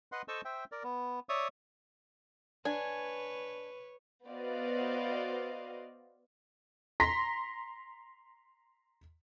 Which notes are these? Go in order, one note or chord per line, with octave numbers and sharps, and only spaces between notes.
B4 D#5 F#5 C6
A4 C5 D#5 A5 C#6 E6
C5 E5 G5
A#4 D5
B3
C#5 D5 E5 C#6 D#6
D4 B4 C#5 G#5
B3 F#4 C5 D5 D#5 F5
A#5 C6 A#6 B6